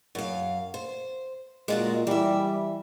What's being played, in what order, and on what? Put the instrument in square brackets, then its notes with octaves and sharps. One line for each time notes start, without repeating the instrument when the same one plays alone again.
[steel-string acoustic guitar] F#2 F5
C5
[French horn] A#2 [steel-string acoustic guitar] G#3 F4 F#4
[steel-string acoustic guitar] E3 E5 [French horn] G3